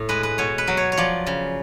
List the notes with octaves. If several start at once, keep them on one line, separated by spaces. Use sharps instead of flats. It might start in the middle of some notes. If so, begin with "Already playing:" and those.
Already playing: A2
G#3 B4
B4
B2 C#5
B4
F#3
C#5
C#5
F3 D5
C#3